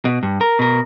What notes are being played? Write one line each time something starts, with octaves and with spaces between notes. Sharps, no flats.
B2
G2
A#4
B2 A#4